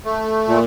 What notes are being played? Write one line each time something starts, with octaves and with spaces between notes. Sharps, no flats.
A3
A#2